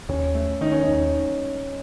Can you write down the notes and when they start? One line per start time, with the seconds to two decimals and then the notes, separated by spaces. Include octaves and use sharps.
0.09 D#2 C#4
0.35 A3
0.61 D#3 D#4
0.71 C#4
0.83 D#4
0.88 D#2